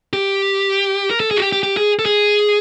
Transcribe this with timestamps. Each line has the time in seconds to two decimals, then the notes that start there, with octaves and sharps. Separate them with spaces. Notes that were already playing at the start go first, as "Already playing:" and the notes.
0.13 G4
1.11 A#4
1.20 A4
1.31 G#4
1.37 F#4
1.42 G4
1.52 G4
1.63 G4
1.77 G#4
1.99 A4
2.06 G#4